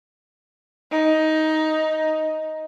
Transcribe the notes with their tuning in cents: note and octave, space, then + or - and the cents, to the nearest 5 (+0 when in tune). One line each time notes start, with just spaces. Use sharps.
D#4 +10